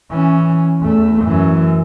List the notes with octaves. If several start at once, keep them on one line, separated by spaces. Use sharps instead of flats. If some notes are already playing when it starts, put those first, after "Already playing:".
E3 C#4
E2 A3
F#2 E3